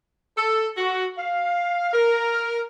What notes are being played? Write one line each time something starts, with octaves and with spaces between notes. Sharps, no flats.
A4
F#4
F5
A#4